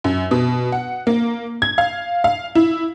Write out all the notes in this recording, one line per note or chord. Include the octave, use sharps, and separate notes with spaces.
F#2
B2
F#5
A#3
G#6
F5
F5
E4